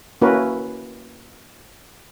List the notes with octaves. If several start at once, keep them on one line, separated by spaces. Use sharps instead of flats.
A#3 C#4 E4 F#4 A#4 B4